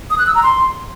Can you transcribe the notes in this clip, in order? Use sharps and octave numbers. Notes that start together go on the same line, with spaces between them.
D#6
F#6
E6
A#5
C6